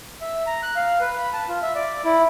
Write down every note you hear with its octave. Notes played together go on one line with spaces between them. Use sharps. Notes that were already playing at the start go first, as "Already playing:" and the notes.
E5
A#5
F#6
F5
B4
B5
A5
F4
E5
D5
E4